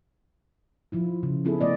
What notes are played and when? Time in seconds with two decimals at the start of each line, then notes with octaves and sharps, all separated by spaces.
0.92 F3 E4 F4
1.23 C#3
1.45 B3 C4 E4 G#4 A4
1.61 A3 B3 D5 D#5